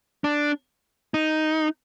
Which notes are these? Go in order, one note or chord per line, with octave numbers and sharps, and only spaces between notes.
D4
D#4